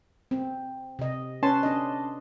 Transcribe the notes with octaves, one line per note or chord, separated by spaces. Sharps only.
C4
C3 D#5
C#4 B4 A5 C6
D4 D#5